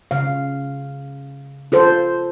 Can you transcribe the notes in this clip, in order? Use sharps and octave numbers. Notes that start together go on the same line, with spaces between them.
C#3 F5
F4 A4 C5